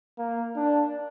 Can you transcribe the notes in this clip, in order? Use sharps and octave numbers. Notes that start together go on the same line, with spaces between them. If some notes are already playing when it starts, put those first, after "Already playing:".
A#3
D4